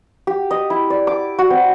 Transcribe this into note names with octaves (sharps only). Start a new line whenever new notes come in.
G4
D#5
E4
D5
D6
F#4
C4